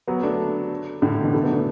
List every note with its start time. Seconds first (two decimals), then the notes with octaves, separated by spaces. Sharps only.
0.08 F#3 B3
0.23 A3 D4
1.02 A2 D3
1.23 B2 E3
1.33 E3 A3
1.44 F#3 B3
1.54 A3 D4